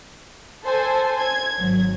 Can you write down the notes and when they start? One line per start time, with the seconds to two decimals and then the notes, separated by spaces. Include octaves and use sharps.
0.64 A4 C5 G#5
1.20 G#6
1.59 G#1 F#3